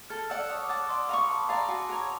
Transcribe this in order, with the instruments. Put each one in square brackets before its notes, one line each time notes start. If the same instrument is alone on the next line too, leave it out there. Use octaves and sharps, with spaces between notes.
[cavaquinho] A4 [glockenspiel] F6
[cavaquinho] D5 F#5 A5 [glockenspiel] E6
[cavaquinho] C#5 [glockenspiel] D#6
[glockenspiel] D6
[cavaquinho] F#5 A5
[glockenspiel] C#6
[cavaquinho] D5 [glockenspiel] C6
[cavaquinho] F5 A#5 C#6 [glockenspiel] B5
[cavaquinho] B4 [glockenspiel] A5
[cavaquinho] D5 F5 A#5 [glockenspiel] C6
[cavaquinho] F#4 [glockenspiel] G#5
[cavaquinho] A#4 C#5